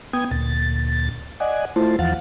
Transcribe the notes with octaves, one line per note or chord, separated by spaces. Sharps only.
B3 G5 D#6 G#6
D2 A#2 A6
D5 D#5 F#5 G#5
A3 E4 F4 C5 A5
E2 E3 F3 F5 F#5 A6